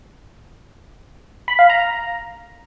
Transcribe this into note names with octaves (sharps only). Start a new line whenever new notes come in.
B5
F5
A#5